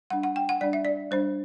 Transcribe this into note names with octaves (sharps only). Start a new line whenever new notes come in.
G3 D4 F#5
F#5
G5
F#5
G3 D4 D5
E5
D5
G3 D4 C5